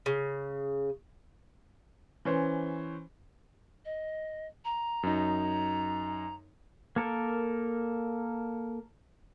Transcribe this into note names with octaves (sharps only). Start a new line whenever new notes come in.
C#3
E3 C#4 C5
D#5
A#5
F#2 D#4
A#3 A4 A#4